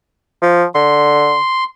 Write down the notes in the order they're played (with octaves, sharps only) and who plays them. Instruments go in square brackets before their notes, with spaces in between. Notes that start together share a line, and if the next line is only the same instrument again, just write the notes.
[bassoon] F3
[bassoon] D3 [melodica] C6